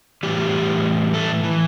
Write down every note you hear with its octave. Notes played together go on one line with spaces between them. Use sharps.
A2 E3 G3 G4
A3 A4
E3